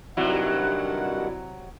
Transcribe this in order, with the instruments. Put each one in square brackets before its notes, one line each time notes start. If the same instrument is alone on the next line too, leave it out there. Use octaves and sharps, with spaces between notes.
[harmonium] G2 D#3 F#5 [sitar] C3 F#3 [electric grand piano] E4 F#4 D5